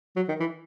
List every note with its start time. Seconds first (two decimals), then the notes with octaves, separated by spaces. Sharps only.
0.16 F#3
0.28 D#3
0.40 E3